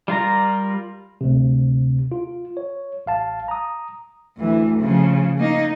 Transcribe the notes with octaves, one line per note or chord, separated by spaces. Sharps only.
G3 F4 A#4 A#5
D2 C3
F4
C#5
A1 F5 A5
A#5 D#6
D2 E3
C#3 F3
A#3 D#4